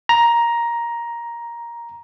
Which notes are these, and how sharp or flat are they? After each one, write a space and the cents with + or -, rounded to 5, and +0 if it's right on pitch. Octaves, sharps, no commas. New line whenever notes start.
A#5 +10